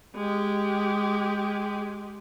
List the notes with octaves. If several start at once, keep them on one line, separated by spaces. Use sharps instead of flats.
G#3 G4